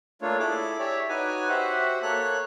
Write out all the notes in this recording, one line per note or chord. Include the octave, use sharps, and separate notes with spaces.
A3 A#3 D4 F4 C#5
E4 G#4 A4 D6
G4 C#5 D5 E5
D#4 F#4 B4 C#5 G#5 D6
F#4 G4 C5 E5 F#5
A#3 A4 C#5 F#6